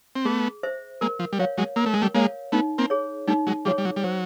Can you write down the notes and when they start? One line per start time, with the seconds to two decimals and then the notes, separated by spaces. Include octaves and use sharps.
0.16 C4
0.25 A3 B3 G#4
0.63 C5 E5
1.01 G#3 A#3 A#4
1.19 F3
1.33 G3
1.39 F#3 C#5 F5
1.58 F#3 G#3
1.76 A#3 A#4
1.86 A3
1.94 G#3
2.02 G3 A3
2.14 G#3 A#3 C#5 F5
2.52 A3 B3 D#4
2.78 A#3 C4
2.90 G#4 C#5
3.28 G3 A3 D#4
3.47 F#3 G#3
3.65 F3 G3 G#4 C#5
3.78 G3
3.85 F#3
3.97 G3
4.04 F#3 C5